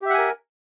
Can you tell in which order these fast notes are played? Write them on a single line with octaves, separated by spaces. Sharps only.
G4 E5 F#5 G#5 A#4